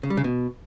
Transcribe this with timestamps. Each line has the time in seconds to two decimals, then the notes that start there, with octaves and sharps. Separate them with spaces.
0.03 C#3
0.10 G3
0.17 C#3
0.24 B2